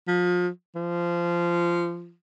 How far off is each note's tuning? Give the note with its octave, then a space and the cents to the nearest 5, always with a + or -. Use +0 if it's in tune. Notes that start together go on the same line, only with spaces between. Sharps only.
F3 +30
F3 -20